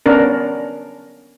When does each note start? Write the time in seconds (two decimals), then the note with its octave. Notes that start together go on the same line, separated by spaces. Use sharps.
0.06 B3 C#4 D4 A#4